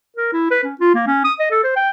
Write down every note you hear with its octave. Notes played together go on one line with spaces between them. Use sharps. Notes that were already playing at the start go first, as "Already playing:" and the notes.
A#4
E4
B4
C#4
F4
A#3
C#4
D#6
D#5
A4
C5
G5